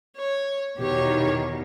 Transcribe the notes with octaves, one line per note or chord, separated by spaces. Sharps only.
C#5
E2 B2 D#3 G4 C#5